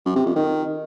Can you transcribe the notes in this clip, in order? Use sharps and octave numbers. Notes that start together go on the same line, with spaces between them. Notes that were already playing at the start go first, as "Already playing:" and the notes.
F#2
C3
F2
D#3